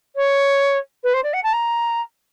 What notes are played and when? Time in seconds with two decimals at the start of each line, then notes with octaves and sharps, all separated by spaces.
0.16 C#5
1.04 B4
1.14 C5
1.23 D5
1.33 F#5
1.43 A5
1.53 A#5